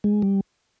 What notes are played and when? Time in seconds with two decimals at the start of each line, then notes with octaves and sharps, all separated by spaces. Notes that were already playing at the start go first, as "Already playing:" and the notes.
0.04 G#3
0.22 G3